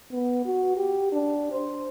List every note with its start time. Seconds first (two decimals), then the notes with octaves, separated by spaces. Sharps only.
0.12 B3
0.46 F#4
0.77 G4
1.13 D4
1.52 C5